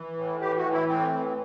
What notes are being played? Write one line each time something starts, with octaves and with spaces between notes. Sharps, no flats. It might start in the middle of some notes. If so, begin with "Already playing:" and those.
Already playing: E3
A2
E3 G4
F#4
E3
E4
A2 C4
E3